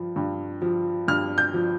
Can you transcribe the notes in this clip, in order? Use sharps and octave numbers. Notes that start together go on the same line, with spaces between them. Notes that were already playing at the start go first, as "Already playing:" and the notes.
Already playing: G2 F3
G2
F3
G2 F6
G6
F3